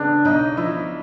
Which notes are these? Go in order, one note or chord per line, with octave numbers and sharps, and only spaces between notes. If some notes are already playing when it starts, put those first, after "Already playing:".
Already playing: C#3 B3 D4
B1 D#4
F3 E4